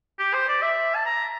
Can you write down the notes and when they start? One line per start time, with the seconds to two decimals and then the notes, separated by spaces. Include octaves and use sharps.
0.19 G4
0.34 C5
0.48 D5
0.62 E5
0.95 A5
1.06 A#5